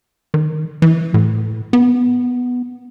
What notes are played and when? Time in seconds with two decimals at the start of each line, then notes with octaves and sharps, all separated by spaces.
0.34 D#3
0.82 E3
1.14 A2
1.73 B3